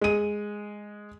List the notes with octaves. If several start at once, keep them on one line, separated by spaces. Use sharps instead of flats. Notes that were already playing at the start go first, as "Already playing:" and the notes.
G#3 D#7